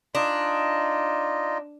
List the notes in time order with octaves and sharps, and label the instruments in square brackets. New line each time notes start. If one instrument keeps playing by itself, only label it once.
[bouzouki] D4 [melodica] D#4 F4 D#5